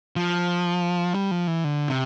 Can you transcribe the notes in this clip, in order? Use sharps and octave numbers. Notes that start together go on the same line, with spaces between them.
F3
G3
F3
E3
D3
C3